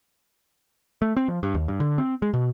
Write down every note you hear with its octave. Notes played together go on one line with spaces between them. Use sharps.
A3
C4
F3
G2
D#2
G2
D3
C4
G#3
B2